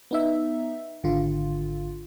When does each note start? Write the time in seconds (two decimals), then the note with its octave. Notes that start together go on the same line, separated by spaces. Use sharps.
0.11 B3 D#4 E5
1.03 G#1 D3 F4